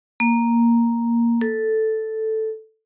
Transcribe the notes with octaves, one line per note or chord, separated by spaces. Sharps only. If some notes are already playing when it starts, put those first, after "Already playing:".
A#3
A4